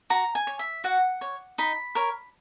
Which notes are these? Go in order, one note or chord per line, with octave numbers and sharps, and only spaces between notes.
F#4 A#5
G#5
C#5
E5
F#4 F#5
C#5
D#4 B5
A#4 C#5